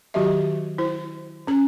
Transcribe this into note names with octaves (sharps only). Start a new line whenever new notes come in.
D#3 F#3 F#4 G4 D#5 E5
E4 C5
C#4 A#5